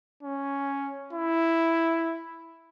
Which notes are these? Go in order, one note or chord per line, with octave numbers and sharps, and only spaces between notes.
C#4
E4